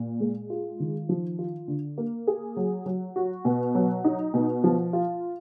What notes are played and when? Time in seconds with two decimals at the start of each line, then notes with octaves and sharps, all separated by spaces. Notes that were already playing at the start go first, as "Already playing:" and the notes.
Already playing: A#2
0.20 G#3
0.50 F4
0.80 D#3
1.09 F3
1.39 F4
1.68 D3
1.98 A#3
2.27 G#4
2.57 F#3
2.86 F#3
3.16 F#4
3.45 B2
3.75 F#3
4.04 D#4
4.34 B2
4.64 F3
4.93 F4